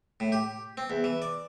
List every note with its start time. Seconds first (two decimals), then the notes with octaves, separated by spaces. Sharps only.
0.20 A2
0.32 G4
0.77 C4
0.90 E2
1.04 E3
1.22 D5